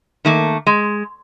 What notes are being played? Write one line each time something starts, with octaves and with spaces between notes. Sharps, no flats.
D#3 A3 A#3
G#3